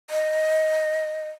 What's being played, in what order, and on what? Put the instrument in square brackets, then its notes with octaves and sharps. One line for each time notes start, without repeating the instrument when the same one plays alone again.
[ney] D#5